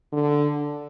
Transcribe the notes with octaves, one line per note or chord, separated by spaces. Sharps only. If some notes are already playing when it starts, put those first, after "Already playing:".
D3